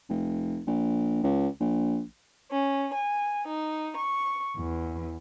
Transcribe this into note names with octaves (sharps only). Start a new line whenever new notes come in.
F1
A#1
C#2
A#1
C#4
G#5
D#4
C#6
E2